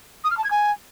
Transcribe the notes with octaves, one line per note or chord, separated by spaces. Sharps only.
D#6
F6
A5
G#6
G#5